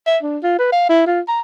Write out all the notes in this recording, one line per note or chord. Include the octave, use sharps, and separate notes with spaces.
E5
D4
F4
B4
F5
E4
F4
A#5